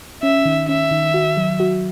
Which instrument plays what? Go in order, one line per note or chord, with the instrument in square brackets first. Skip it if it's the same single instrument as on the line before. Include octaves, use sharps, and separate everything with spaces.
[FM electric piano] C#4 [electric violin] E5
[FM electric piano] D#3
[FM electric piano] C#4 [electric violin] E5
[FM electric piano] D#3
F#4
F#3
F#4